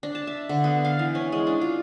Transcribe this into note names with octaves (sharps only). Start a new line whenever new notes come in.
D4
A5
E5
D3
B3
F5
E3
C#4
G#3
D4
F4